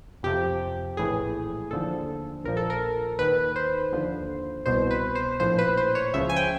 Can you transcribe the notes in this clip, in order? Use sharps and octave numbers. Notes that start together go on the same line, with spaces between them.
F2 C3 F3 G4
A#1 A2 E3 G#4
D#2 D3 F3 A4
A#1 A#2 F3 A#4
A4
A#4
D#2 D#3 B4
C5
D#2 D3 F3
C2 B2 C5
B4
C5
A#1 A2 F3 C5
B4
C5
C#5
C#2 C#3 F3 E5
G#5
G5